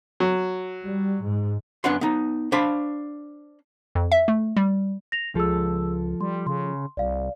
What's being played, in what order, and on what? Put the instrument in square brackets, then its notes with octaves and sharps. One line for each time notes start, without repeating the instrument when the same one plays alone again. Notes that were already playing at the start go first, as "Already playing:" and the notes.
[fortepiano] F#3
[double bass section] G3
G#2
[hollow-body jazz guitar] F#2 B3 D4 F#5 C6
B3 D#4
D4 C5 F5 B5
[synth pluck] F2
E5
A3
G3
[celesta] A#6 F7
[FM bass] C#2 [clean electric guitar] F3 A4 [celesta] G#4 E6
[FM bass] G3 [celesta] C6
[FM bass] C#3 [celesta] C6
[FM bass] C2 [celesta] D5 F5